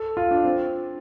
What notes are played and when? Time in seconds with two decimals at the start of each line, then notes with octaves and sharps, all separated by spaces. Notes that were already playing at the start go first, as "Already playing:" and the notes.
Already playing: A4
0.17 F4
0.31 D4
0.45 C4